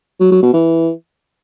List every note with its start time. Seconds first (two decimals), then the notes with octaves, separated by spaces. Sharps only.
0.20 F#3
0.31 F#3
0.43 B2
0.54 E3